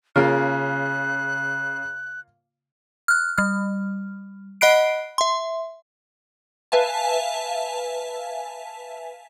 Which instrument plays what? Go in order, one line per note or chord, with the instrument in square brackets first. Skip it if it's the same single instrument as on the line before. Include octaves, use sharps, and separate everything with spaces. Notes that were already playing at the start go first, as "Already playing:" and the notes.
[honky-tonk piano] C#3 [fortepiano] A#3 F4 [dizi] F#6
[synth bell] F6 F#6
G3 F6
D#5 F#5 B5 F#6 C7 D7
E5 C6
B4 E5 F5 G#5 A5